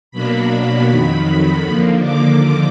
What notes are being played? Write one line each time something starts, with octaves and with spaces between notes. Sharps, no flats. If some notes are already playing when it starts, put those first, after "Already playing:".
B2 F#3 A#3 D4 B5
F2 D#3 F#3
D#2 D3 F3 A#3
D6